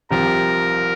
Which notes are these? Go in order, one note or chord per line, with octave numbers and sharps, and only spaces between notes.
C2 C3 F3 C4 G4 A#4